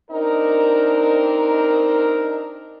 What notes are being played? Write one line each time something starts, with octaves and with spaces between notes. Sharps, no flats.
C4 D4 D#4 A#4